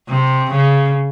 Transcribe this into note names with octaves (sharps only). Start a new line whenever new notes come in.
C3
C#3